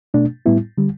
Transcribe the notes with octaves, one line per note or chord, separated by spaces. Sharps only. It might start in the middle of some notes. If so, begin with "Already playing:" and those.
B2 A3 D4
A2 G3 B3 E4
D3 G3